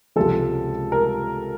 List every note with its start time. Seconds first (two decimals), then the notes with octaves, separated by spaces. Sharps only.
0.16 C#2 C3 F3 A4
0.92 A#4